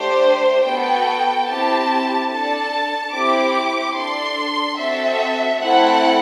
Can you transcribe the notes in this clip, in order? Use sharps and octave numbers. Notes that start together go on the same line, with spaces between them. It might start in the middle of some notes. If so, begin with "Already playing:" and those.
Already playing: A3 D4 G4 C5
B3 F#4 A4 G5
C4 E4 G4 A5
D4 A4 A5
C4 E4 G4 D6
D4 A4 C6
C4 F#4 A4 E5
A3 C4 E4 A4 F#5